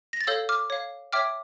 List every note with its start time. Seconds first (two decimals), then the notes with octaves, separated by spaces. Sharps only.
0.13 A#6
0.21 A6
0.27 A4 C#5 F5 E6 G6
0.49 D6 F6
0.70 C#5 F5
1.13 C#5 E5 G5 D6 F6